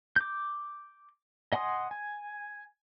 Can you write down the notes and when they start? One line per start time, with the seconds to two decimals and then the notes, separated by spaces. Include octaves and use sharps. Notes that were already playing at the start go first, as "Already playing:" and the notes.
0.16 D6 G6
1.53 D#5 F#5 G#5 C6 D#6
1.91 G#5